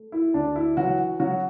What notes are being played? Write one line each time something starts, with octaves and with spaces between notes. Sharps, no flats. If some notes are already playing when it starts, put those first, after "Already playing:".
Already playing: A3
E4
D2 D4
E4
E3 F#3 F#4
C#3 F#3 F#4